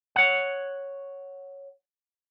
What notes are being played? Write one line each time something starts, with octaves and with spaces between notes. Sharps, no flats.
C#5 F#5